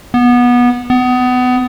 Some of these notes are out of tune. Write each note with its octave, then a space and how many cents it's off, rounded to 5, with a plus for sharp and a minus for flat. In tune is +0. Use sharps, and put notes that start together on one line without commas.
B3 -20
B3 +25